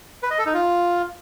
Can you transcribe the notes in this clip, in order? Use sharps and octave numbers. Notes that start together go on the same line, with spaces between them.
B4
D#5
A4
D#4
F4